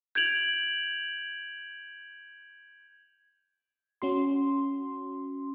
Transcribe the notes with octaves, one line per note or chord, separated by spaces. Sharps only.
G6 G#6 D7 F7 F#7
C#4 F#4 C6